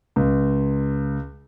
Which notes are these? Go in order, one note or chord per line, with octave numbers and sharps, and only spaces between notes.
C#2